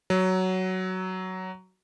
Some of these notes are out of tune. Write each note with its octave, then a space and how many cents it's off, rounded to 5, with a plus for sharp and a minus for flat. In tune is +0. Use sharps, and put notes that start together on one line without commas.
F#3 +10